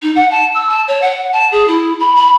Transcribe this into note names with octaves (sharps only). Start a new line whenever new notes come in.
D#4
F#5
A5
E6
A5
C#5
F#5
A5
G#4
E4
B5
B5